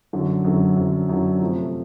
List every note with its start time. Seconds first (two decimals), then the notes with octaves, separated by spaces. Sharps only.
0.13 F#2 D3 F#3
0.45 F#2 D3 F#3
0.77 F#2 D3 F#3
1.09 F#2 D3 F#3
1.41 C3 F3 A3